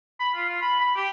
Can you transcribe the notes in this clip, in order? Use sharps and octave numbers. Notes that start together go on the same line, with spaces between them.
B5
F4
F4
B5
B5
G4